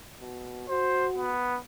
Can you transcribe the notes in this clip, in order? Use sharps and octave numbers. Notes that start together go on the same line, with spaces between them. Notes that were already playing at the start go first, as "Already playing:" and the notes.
B2
F#4 C5
B3